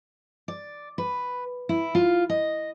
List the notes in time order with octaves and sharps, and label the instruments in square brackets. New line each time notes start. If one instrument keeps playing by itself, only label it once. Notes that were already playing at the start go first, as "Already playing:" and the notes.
[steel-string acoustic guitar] D5
B4
E4
F4
D#5